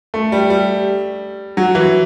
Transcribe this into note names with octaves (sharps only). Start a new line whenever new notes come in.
A3
G3
G3
F#3
E3